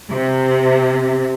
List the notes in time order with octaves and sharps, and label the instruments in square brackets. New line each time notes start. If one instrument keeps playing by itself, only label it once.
[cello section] C3